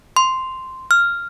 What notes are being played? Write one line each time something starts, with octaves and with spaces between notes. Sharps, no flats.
C6
F6